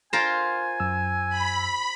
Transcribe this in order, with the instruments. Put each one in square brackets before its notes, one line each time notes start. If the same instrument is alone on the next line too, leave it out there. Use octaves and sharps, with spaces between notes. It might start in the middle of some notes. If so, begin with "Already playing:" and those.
[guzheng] F4 A#4 C5 [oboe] G#5
[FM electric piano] F#2 E6
[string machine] B5